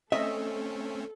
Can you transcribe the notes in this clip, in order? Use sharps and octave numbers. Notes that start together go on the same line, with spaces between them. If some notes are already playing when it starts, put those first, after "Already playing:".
A3 C4 C#4 A4 D#5 E5